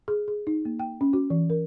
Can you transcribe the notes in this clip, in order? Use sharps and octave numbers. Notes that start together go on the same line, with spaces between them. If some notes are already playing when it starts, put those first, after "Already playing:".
G#4
G#4
D#4
A#3
G5
C#4
F#4
E3
A#4